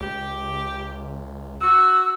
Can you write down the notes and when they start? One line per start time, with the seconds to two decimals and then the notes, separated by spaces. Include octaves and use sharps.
0.01 C#2 G4
1.61 F#4 E6